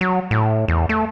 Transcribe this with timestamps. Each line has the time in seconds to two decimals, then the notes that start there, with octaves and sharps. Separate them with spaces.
0.01 F#3
0.31 A2
0.68 E2
0.89 A3